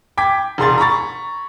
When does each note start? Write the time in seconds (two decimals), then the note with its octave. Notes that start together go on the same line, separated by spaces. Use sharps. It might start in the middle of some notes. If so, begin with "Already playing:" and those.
0.17 G5 D6 G#6 B6
0.58 E1 G#4 C6 A6
0.78 A#5 B5 C#6 A6